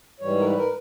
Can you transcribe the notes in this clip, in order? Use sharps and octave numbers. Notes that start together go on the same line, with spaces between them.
G#2 E3 G3 C#5
A#4
B4
A#4